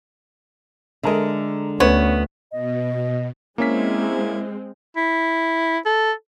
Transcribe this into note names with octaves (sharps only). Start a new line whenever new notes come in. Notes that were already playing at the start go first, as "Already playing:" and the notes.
D3 G#3 A4 A#4 E5
D2 B3 C#4 B4 C#5
B2 D#5
G#3 A#3 C4 C#4 E4 B6
E4
A4